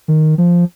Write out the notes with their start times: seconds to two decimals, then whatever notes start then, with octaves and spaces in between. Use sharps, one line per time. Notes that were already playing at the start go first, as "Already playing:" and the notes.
0.08 D#3
0.38 F3